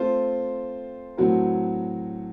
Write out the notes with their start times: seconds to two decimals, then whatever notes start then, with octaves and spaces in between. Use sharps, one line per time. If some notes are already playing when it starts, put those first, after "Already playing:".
Already playing: A3 C4 F4 C5
1.17 A2 F#3 C4 F#4 A#4